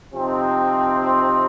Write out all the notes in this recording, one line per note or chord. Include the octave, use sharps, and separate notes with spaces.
C3 F3 C4 D#4